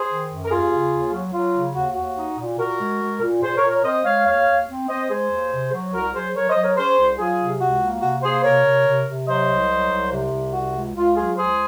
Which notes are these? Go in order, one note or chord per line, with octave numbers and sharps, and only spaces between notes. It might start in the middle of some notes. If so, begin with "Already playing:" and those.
Already playing: G#4 C5
D#3
F#2
A#4
D#2 F4 G#4
C#3
D#2
F#3
F#3 F4
C#3
D#2 F#4
D#2 F#4
D#4
A#2
A#2 F#4 A#4
G#3
G#3
A#2
A#2 G#4 C5
A#4 C#5
A#2
A#4 C#5
C4 C5 D#5
G#3 C#5 F5
D#2 C#5 F5
D#2
C4
C4 C5 D#5
G#3 G#4 C5
D#2
C3
F#3
C2 F#4 A#4
F#3 G#4 C5
F#3 A#4 C#5
C5 D#5
F#3
A#4 C#5
C#4 G#4 C5
C2
F#3 F4 G#4
C3
C#2 F#4
A#3
C3 F#4
A#3 G#4 C5
C3 A#4 C#5
C3
C3
C3
F#3 C5 D#5
C2
F#3
C2
C3
C2
C3 F#4
C#2
C#2 F4
F#3 F4 G#4
C#2 G#4 C5